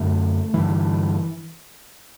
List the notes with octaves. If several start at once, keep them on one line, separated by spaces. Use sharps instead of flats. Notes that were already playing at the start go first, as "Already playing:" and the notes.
Already playing: F#2 D3 A3
G2 D3 E3